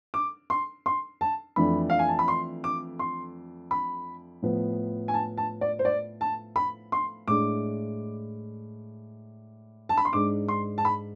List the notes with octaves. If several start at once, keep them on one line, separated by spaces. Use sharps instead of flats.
D6
C6
C6
A5
F2 E3 A3 D4 B5
F5
G#5
A5
B5
C6
D6
C6
B5
A2 F3 B3
G#5
A5
A5
D5
C5
D5
A5
B5
C6
A2 G#3 D4 D6
A5
B5
C6
G#2 G#3 D4 D6
C6
A5
B5